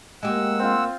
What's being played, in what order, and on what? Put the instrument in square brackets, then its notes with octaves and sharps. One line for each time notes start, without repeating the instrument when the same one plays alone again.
[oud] G#3 G4 [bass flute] A#3 [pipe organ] F#5 E6
[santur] C4 F4